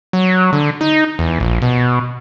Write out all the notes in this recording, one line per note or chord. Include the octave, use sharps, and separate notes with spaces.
F#3
D3
D#4
E2
A#1
B2